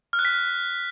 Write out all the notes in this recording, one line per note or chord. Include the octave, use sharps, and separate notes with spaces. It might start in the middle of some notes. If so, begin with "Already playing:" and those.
F6
F#6
B6